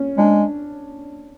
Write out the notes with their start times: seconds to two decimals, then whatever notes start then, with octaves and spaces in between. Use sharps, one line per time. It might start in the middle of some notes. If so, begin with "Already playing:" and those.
Already playing: C#4
0.18 G#3 D4